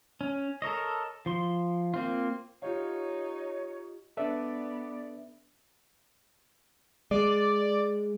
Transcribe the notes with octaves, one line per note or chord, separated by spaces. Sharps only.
C#4
A4 A#4 C#5 D#5
F3 C6
A#3 C4 F4
D#4 F4 G4 C#5 F5
B3 D4 A4 B4 D5 E5
G#3 D5